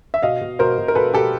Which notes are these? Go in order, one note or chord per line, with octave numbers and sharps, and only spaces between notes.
E5
B2 D#5 F5
B2
B2 A#4 C5
B2
A#4
B2 A4 B4
B2 G4 A4